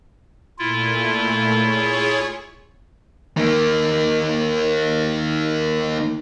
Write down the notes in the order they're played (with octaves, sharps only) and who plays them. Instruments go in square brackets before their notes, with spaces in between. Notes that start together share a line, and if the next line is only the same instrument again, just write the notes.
[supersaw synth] A#2 A3 [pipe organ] E4 F4
[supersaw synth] G#4 C#5
[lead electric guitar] D#3 A#3